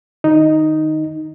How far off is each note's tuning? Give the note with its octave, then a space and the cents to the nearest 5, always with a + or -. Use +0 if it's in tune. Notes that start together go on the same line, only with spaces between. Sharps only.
D#3 -25 D#4 +0